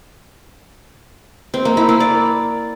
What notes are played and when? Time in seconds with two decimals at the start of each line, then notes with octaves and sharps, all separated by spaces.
1.54 C4
1.65 A#3
1.77 E4
1.89 A#3
2.00 D5